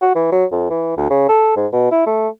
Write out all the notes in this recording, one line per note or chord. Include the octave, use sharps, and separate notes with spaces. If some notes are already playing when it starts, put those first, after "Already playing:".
F#4
E3
F#3
F2
E3
D2
C#3
A4
G#2
B2
E4
A3